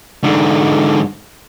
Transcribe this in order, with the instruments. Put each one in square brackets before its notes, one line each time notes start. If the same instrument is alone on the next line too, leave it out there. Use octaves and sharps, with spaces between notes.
[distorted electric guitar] G#2 D3